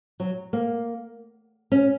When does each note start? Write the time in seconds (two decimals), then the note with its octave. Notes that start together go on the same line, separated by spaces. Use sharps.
0.20 F#3
0.53 A#3
1.72 C#4